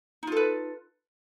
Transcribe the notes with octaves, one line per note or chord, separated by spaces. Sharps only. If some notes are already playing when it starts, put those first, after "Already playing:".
D#4 F4 A4 B4